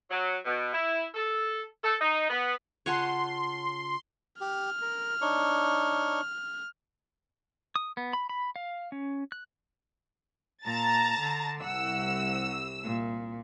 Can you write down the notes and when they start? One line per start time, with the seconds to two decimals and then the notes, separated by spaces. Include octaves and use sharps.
0.10 F#3
0.45 B2
0.73 E4
1.15 A4
1.84 A4
2.01 D#4
2.29 B3
2.86 C#3 F4 C#5 F#5 G#5 A5 C6
4.41 G4 F6
4.82 A#4
5.21 D4 D#4 C#5
7.76 D#6
7.97 B3
8.13 B5
8.29 B5
8.56 F5
8.92 C#4
9.32 F#6
10.65 A#2 A5 A#5 A6
11.19 D3
11.63 C2 F#5 E6
12.84 A#2